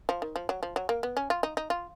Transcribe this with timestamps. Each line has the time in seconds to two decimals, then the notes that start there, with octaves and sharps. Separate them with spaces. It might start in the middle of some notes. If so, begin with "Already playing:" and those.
0.09 F3
0.22 D#3
0.36 F3
0.49 F#3
0.63 F3
0.76 F#3
0.89 A#3
1.03 B3
1.17 C#4
1.30 F4
1.43 D#4
1.57 D#4
1.70 F4